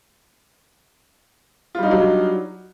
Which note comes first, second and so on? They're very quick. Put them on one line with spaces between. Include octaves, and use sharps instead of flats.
F4 G3 D#4 D4 F#3